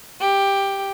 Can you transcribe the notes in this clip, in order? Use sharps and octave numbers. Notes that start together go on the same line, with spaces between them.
G4